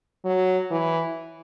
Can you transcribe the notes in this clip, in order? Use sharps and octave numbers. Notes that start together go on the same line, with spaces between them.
F#3
E3